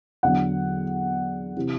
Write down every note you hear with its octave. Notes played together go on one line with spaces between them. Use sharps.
E2 D3 F#3 F#5
C3 E3